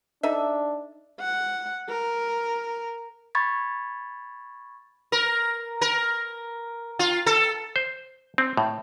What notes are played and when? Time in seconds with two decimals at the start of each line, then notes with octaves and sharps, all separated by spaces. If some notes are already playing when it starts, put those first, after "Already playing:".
0.23 D4 D#4 A4 E5
1.20 F#5
1.89 A#4
3.35 B5 C#6 G#6 A6
5.12 A#4
5.81 A#4
6.99 F4
7.26 A4
7.76 C5
8.38 C4
8.57 A2